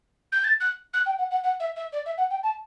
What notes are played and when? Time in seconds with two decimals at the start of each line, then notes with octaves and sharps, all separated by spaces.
0.32 G6
0.44 A6
0.60 F#6
0.93 F#6
1.06 G5
1.18 F#5
1.30 F#5
1.43 F#5
1.60 E5
1.76 E5
1.92 D5
2.06 E5
2.18 F#5
2.30 G5
2.43 A5